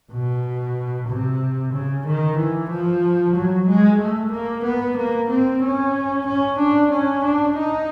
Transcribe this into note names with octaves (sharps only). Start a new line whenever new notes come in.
B2
C3
C#3
D#3
E3
F3
F#3
G#3
A3
A#3
B3
A#3
C4
C#4
C#4
D4
C#4
D4
D#4